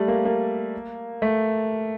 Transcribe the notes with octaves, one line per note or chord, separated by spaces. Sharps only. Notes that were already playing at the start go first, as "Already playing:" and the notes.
Already playing: G3 A3
A#3
A#3
A3